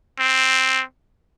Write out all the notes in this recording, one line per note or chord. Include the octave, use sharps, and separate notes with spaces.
C4